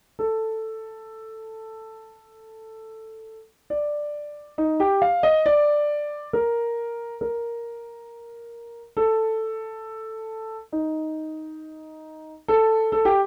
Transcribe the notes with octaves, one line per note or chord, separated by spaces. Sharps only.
A4
D5
D#4
G4
F5
D#5
D5
A#4
A#4
A4
D#4
A4
A4
G4